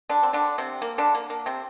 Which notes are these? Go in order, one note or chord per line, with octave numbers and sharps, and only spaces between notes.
D3 D4
C4
D3 D4
C3 C4
A#3
D3 D4
A#3
A#3
C3 C4